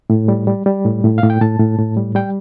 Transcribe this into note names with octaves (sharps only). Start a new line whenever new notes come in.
A2
G3
G3
G3
A2
A2
A2 F5
G5
A2 A5
A2
A2
G3
G3 G5